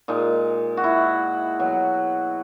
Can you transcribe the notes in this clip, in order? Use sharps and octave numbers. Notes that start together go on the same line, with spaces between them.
A#2 G#3 D#4
F#4
E4
B2 F#3 F#4